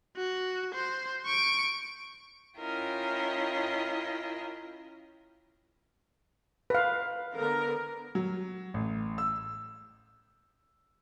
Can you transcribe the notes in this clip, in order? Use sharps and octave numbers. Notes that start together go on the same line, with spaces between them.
F#4
C5
C#6 D7
C#4 E4 F4 A#4 D#5 G5
B4 F5
D3 B3 A#4
F#3
A1
E6